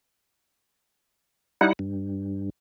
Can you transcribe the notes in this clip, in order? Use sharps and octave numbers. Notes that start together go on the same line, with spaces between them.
G3 D#4 E4 F#5
G2